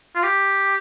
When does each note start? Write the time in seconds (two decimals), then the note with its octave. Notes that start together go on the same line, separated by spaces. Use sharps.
0.15 F4
0.23 G4